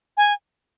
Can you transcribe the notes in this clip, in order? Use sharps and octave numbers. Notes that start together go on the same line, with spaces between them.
G#5